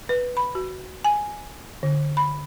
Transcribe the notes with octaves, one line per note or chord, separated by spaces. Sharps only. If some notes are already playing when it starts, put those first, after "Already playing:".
B4
B5
F#4
G#5
D3
B5